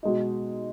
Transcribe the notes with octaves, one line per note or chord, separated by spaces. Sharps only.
B2 G#3 D#4